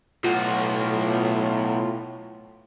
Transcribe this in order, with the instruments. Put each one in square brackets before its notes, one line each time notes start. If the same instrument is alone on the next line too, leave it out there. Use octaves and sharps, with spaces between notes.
[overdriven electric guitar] B1 F#4 [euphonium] A2 [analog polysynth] F4